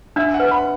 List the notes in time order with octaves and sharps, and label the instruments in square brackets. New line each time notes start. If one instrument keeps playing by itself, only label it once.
[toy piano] D4 [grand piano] E5
[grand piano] F#5
[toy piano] B4
[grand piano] B5